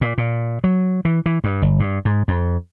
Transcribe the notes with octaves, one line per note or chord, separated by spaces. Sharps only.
A#2
A#2
F#3
E3
E3
G2
G1
G2
G#2
F2